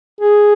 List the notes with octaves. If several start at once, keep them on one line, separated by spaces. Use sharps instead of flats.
G#4